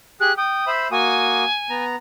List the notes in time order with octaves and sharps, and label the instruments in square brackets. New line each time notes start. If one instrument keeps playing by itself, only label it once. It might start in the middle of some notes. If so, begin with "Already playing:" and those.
[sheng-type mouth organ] G4 G#4 [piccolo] F#6
[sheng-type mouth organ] G5 [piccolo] D#6
[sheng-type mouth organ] C5 E5 B5
[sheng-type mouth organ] A#3 F#4 D#6 [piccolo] G#5
[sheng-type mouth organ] B3 A#5